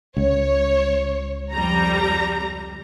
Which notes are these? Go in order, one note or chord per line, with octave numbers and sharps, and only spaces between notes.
C#2 C#5
F2 G3 A#5